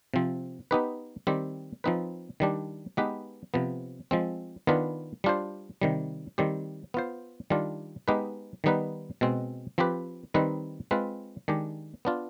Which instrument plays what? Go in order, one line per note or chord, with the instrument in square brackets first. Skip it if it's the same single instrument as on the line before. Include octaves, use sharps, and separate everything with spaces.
[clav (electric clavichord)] C3 F3 C4
B3 D#4 G4 B4
D#3 G3 C4 G4
F3 C4 D#4 B4
D#3 G3 D4 G4
G#3 B3 D#4 G4 B4
C3 F3 B3
F3 G#3 C4
D#3 B3 D4 F4 B4
G3 D4 F4 C5
C3 D#3 G3
D#3 G3 C4 G4
B3 F4 C5
D#3 G3 D4 F4
G#3 B3 D#4 G4 B4
D#3 G3 B3 D#4 B4
B2 G#3 C4
F3 C4 G4 B4
D#3 G3 C4 D#4 B4
G#3 C4 F4 B4
D#3 G#3 D4 G4
B3 D4 F4